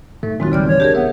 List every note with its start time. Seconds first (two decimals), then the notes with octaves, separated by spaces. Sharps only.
0.23 G#2 A3
0.40 D#2 A#2 D#3 F#3 G#3 C4 F4 F#4
0.52 A#1 C#3 G3 D5 F6
0.67 E3 C#5
0.80 C2 D4 G4 G#4 A#4
0.95 A1 B3 E5